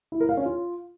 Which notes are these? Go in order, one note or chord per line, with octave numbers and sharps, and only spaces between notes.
E4
A#4
F5
C#4
F4